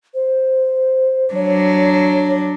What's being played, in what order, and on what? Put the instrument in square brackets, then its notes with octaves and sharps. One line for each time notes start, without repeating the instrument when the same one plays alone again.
[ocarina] C5
[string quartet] F#3 D4 [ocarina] C#5